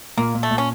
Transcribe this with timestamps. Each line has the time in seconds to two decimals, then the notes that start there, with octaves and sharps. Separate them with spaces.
0.17 A#2 A#3
0.35 A#2
0.43 A3
0.51 A#2
0.58 C#4